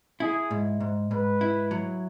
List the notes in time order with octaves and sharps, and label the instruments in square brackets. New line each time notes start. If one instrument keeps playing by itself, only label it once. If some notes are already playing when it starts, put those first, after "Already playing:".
[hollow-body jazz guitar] E4 [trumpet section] G#4
[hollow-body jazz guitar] G#2
G#2
[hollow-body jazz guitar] G#2 [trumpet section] B4
[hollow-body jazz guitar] E4
F#3